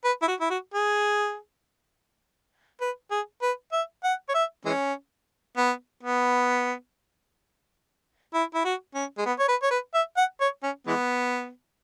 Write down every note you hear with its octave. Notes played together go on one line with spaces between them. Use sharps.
B4
E4
F#4
E4
F#4
G#4
B4
G#4
B4
E5
F#5
C#5
E5
E3 G#3 C#4
B3
B3
E4
E4
F#4
C#4
G#3
B3
C#5
B4
C#5
B4
E5
F#5
C#5
C#4
E3 G#3 B3